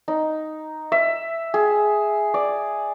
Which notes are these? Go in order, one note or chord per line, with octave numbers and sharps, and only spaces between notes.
D#4
E5
G#4
D5